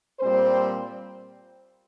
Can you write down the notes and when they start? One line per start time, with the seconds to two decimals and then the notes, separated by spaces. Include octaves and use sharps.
0.19 A#2 G3 C4 C5